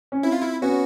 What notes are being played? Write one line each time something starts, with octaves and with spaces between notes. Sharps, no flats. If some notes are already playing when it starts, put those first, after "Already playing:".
C#4
C4 E4
F4
E4
B3 C#4 F#4